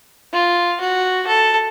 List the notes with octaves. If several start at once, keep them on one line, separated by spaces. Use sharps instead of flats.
F4
F#4
A4